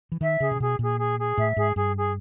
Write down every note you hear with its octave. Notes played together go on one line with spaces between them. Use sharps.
E3
D#3 E5
C#3 G#4
C3
B2 G#4
A#2 G#4
G#4
G#4
A2 E5
G#2 G#4
G2 G#4
G#4